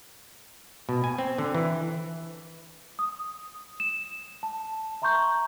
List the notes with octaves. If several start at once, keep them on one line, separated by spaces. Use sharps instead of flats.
B2
G#5
C4
D3
E3
D#6
E7
A5
E5 A#5 C6 C#6 G6